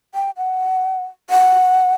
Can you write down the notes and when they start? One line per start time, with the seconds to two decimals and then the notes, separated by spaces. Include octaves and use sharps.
0.14 G5
0.37 F#5
1.30 F#5